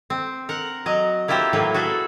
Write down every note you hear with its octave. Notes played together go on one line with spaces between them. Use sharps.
C4
A#4 F#5
F#3 D#5 A#5
A#3 E4 F4 G4 C5 E5
A2 F#3 A#3 B4 C#5
F#4 G#4 A4 E5